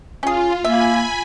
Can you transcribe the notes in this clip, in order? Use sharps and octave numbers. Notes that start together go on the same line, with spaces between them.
C#4 F4 G#4
A#3 E5 G#5 B5